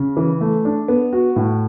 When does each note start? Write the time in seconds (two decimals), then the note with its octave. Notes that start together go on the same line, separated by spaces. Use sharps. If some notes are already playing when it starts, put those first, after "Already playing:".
Already playing: C#3
0.17 E3
0.41 A3
0.65 D4
0.88 B3
1.13 F#4
1.36 A2